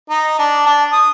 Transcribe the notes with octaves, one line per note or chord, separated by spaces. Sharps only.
D#4
D4
D4
D#6